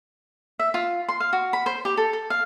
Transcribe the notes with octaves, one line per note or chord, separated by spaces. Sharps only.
E5
F4
C6
F5
F#4
B5
C5
G4
A4
A4
F5